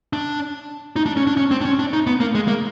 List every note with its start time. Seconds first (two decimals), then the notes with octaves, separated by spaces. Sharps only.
0.13 D4
0.96 D#4
1.06 D4
1.17 C#4
1.27 D4
1.37 C#4
1.51 C4
1.61 D4
1.65 C#4
1.79 D4
1.93 D#4
2.07 B3
2.20 A#3
2.35 G#3
2.48 A#3